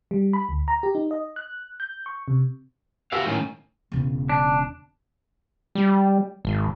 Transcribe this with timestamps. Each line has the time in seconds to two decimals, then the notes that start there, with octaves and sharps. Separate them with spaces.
0.11 G3
0.33 B5
0.49 D2
0.68 A#5
0.83 G4
0.95 D#4
1.11 D#5
1.36 F#6
1.80 G6
2.06 C#6
2.28 C3
3.12 F#4 G4 B4 E5 F5
3.26 A2 D#3 C#4
3.92 E1 C#3
4.29 D4
5.75 G3
6.45 G#1